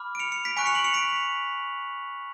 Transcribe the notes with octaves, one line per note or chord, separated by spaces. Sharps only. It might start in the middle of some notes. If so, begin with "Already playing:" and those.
Already playing: B5 D6 F6
D7
C#7 F7
C#7 F7
B6 D7
G#5 C#6 F#6 B6 D7
C#7 F7
D7 F#7
C#7 F7
B6 D7